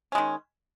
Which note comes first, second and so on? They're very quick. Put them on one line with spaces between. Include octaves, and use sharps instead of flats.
C#4 G#3 D#3